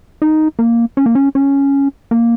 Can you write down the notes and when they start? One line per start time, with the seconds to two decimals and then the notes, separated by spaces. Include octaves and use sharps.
0.22 D#4
0.59 A#3
0.97 C#4
1.06 A#3
1.15 C#4
1.35 C#4
2.11 A#3